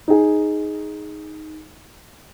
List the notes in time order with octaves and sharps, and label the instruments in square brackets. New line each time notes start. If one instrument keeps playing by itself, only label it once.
[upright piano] D#4 G#4